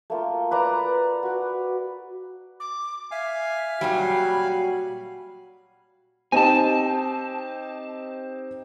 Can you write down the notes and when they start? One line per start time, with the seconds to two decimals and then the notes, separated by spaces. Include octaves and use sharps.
0.10 A3 A#3 F4
0.51 B4 D5 A#5 C#6
1.23 F#4 B4
2.60 D6
3.11 E5 F5 G#5
3.81 A#2 F#3 G3 F#4
4.09 B5
6.32 C4 D#4 G4 G#5 A5